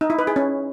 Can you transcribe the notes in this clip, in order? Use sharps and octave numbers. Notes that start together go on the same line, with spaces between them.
D#4
E4
B4
G#4
C#4